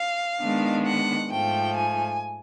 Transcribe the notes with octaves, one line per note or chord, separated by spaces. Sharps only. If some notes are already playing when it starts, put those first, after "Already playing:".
Already playing: F5
D#3 G#3 B3 D4
F#5
G#2 F3 A3 G5
G#5